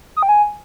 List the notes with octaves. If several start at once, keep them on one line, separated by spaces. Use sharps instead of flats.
D#6
G5
G#5